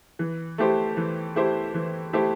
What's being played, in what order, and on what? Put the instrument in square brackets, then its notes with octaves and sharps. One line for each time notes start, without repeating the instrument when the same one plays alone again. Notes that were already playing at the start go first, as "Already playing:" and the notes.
[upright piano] E3
A3 E4 G4 C5
E3
A3 E4 G4 C5
E3
A3 E4 G4 C5